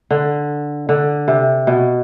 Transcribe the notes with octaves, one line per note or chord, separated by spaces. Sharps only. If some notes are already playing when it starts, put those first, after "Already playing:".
D3
D3
C3
B2